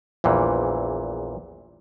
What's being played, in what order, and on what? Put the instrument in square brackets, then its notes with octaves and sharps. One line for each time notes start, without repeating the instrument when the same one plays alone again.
[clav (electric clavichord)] A#1 E2 A#2 E3 G3